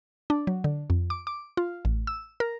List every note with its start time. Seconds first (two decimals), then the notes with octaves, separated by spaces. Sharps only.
0.30 D4
0.47 F#3
0.64 D3
0.90 F2
1.10 D6
1.27 D6
1.57 F4
1.85 A1
2.07 E6
2.40 A#4